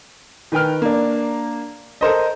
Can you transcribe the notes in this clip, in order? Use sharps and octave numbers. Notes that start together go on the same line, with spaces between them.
D#3 B4 G5 F6
A#3 D4
A4 A#4 C5 D#5